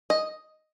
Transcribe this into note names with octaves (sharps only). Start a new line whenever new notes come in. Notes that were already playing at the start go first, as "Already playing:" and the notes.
D#5